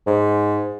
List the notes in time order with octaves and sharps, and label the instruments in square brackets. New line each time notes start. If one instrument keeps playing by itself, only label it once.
[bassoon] G#2